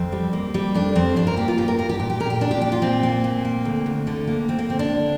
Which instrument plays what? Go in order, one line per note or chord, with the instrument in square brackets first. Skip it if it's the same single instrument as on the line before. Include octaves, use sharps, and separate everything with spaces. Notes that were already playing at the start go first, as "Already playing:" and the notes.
Already playing: [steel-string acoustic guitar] F2 C4
G3
A#3
G3
F2 D4
F2 C4
G2 D4
A#4
A#3 G4
F4
G2 G4
A#4
G2 A#4
G4
A#2 G4
G4
A#2 A#4
G4
A#2 D4
G4
A#3 G4
F4
A#2 C4
A#3
A#2
A#3
D2
D2
D3
A#3
D2 C4
A#3
A#3 C4
D4
D3